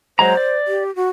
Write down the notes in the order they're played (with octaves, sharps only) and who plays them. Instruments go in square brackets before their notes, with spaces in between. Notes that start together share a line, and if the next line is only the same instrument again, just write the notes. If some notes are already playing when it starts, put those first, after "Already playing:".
[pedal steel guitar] F#3 G#3 A#5 [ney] C5
[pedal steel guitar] D5
[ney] G4
F#4